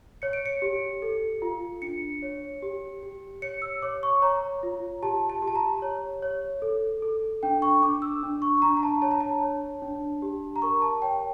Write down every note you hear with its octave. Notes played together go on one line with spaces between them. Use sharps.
C#5 C#7
D7
C#7
G4
A4
F4
D4 C#7
C#5
G4
G4
C#5 C#7
E6
C#5 D6
C#6
C#5 A#5
F4
G4 A5
A5
G4
A5
A#5
C#5
C#5
A4
A4
D4 G5
C#6
D4 D6
E6
D4
C#6
C#6
D4 A#5
A#5
A5
C#5 A5
A#5
A5
C#5
D4
G4
A#5
A#4 C#6
A5
C#5 G5